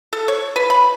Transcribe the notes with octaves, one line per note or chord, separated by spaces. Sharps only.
A4
C#5
B4
B5